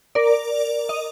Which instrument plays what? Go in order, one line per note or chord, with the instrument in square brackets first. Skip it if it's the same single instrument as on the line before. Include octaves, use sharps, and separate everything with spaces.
[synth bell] A#4 D5
D#5